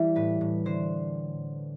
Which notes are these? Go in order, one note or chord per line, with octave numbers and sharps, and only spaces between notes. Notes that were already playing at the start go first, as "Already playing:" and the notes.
Already playing: E3 G3
A2 B4
A2
D3 C5